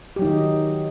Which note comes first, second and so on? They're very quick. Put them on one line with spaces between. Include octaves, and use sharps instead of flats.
G4 F#3 D#4 D#3